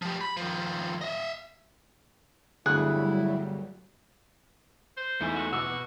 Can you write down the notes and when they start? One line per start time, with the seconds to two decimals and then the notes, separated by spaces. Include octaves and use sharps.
0.02 F3 G4
0.21 B5
0.37 D#3 F3
1.01 D#5 E5
2.66 G1 D2 F#3 G3 E4 G#4 F#6
4.97 C5
5.21 E2 A3 D#4 E4 G#5
5.36 F#4
5.53 B2 F#4 D6 E6